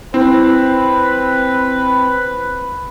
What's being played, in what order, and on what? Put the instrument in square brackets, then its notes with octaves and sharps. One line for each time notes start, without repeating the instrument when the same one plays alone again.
[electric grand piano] C4 [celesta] E4 [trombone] B4